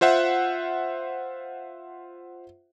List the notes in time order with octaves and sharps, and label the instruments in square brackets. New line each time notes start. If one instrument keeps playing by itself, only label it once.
[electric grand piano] F4 C5 E5 F#5